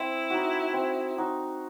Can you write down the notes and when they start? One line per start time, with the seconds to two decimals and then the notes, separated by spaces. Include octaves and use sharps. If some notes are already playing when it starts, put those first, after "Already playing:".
Already playing: C4 E4
0.30 D#4 F#4
0.73 C4
1.18 D#4 F#4